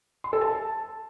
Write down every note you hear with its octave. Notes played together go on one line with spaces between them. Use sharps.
C6
A4
A5